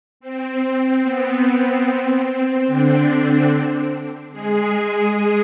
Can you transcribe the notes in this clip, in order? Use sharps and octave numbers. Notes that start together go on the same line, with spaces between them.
C4
B3
C4
D3 D4
G#3 G#4